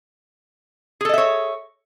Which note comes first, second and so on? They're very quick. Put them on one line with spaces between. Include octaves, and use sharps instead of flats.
G#4 A4 D#5 E5 C#5